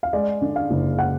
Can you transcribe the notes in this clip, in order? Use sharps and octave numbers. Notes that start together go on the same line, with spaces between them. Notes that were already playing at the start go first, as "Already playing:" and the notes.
F5
G#3 D5
D3
F5
F#1
F#5